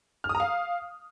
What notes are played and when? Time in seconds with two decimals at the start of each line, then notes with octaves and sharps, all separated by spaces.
0.24 F6
0.29 D#6
0.35 A#5
0.40 F5